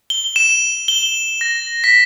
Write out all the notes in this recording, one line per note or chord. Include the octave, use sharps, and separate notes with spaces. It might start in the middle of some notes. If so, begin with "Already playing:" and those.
G7
E7
G7
A#6
B6